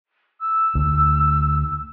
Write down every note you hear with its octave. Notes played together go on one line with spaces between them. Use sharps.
E6
D2